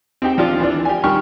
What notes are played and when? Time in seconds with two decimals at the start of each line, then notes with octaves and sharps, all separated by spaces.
0.22 C4 D#4 G4 G5
0.38 F3 D4 F4
0.60 E3 D4
0.85 G4 G#5
1.03 D#3 G3 G4 C#6 F6